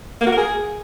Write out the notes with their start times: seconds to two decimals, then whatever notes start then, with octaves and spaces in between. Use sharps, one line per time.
0.21 A#3
0.26 F#4
0.32 A#4
0.38 G#4